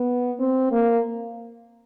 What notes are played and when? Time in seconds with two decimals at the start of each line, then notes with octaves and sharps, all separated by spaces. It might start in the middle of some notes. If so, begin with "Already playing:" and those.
Already playing: B3
0.40 C4
0.72 A#3